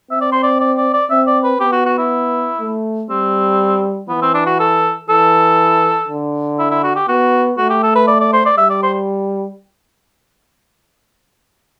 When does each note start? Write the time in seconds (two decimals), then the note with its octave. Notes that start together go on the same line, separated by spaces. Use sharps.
0.11 C4 E5
0.21 D5
0.32 C5
0.43 D5
0.61 D5
0.77 D5
0.94 D5
1.10 C4 E5
1.27 D5
1.44 B4
1.60 B3 G4
1.72 F#4
1.86 F#4
1.98 E4
2.60 A3
3.10 G3 C4
4.09 E3 B3
4.22 C4
4.34 D4
4.46 F#4
4.59 A4
5.09 E3 A4
6.08 D3
6.59 E4
6.71 E4
6.84 F#4
6.96 G4
7.08 B3 F#4
7.58 A3 F#4
7.70 G4
7.83 A4
7.95 B4
8.08 D5
8.21 D5
8.33 C5
8.46 D5
8.57 G3 E5
8.70 D5
8.83 C5